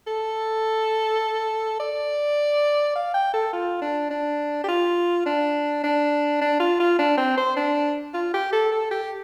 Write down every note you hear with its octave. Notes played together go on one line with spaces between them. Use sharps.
A4
D5
F5
G5
A4
F4
D4
D4
G4
F4
D4
D4
D4
F4
F4
D4
C4
C5
D4
F4
G4
A4
A4
G4